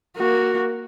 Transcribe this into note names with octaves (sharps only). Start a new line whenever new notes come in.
A#3 F#4